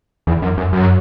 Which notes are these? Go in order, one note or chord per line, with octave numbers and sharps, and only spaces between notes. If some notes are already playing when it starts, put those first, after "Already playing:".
E2
F#2
F#2
F#2